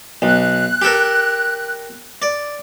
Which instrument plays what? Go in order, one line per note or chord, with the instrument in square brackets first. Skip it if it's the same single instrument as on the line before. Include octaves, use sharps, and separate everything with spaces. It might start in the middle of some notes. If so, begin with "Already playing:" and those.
[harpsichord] B1 [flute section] F#6
[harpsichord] G4 A4 A#4
D5